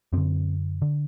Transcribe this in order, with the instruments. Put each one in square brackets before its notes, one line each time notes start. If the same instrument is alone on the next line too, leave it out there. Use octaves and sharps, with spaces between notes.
[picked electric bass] F#2 D3 C4
D3